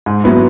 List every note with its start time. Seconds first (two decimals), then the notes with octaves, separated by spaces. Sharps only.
0.06 G#2
0.24 F#3 B3 E4